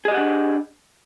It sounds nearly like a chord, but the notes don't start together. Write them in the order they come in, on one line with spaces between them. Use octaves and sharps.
G#4 D#5 G4 F#5 D4